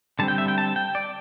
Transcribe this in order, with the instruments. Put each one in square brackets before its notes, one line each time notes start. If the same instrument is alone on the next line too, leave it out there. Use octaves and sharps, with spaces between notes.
[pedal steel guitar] D3 G3 C4 A5
G5
E5
G5
A5
G5
D5